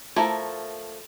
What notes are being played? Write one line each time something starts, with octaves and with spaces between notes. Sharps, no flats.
F3 A3 E4 A#4